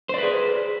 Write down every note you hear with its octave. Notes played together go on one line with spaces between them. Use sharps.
G#4 B4 C5 D5